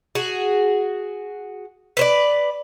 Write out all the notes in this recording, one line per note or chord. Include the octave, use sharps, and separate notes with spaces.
F#4 G#4
B4 C5 D5